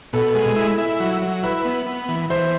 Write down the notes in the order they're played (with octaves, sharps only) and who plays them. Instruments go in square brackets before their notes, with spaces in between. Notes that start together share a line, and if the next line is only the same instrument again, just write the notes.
[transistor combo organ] B2 [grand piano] A4
[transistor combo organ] G#3
E4
E4
F#3
F#3
[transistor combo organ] E4 [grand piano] B4
[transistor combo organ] B3
B3
E3
[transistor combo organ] E3 [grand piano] C5